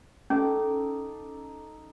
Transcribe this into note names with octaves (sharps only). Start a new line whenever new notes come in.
C#4 D#4 A4 D6